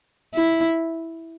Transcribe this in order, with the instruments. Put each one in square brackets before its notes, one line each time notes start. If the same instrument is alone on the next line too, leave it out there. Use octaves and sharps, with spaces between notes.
[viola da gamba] E4